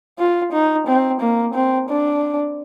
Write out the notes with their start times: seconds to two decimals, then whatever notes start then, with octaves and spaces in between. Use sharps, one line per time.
0.19 F4
0.53 D#4
0.87 C4
1.21 A#3
1.55 C4
1.89 D4